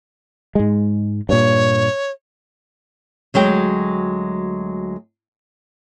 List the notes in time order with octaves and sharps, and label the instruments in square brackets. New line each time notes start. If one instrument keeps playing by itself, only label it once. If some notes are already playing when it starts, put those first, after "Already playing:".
[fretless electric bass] G#2 G#3
[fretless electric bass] G2 A#2 [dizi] C#5
[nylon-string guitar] D2 F#3 G#3 G5